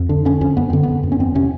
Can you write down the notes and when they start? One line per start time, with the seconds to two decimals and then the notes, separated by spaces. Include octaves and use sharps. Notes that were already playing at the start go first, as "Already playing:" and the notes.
Already playing: F2
0.09 D3 D4
0.25 D3 C#4
0.41 F2 C#4
0.57 F#2 B3
0.70 D3 C4
0.83 D3 B3
1.03 F#2
1.12 C#4
1.19 E2 C4
1.35 C3 C#4